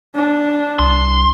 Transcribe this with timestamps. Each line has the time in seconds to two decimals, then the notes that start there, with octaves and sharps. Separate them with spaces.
0.15 D4
0.79 C2 C6